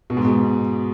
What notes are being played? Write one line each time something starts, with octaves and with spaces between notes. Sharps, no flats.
B2
G#2
B2